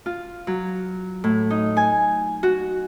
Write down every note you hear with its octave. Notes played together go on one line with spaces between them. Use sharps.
F4
F#3
A2
D#4
G#5
F#4